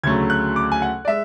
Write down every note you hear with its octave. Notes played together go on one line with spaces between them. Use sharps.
D2 C#3 F#3 A3 G#6
F#6
D6
G#5
F#5
D5
G#3 E5